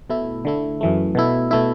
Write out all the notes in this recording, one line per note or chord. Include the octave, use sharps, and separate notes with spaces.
B2 A3 E4
D3 A3 E4
F#2 E3 A3
B2 A3 E4
B2 A3 E4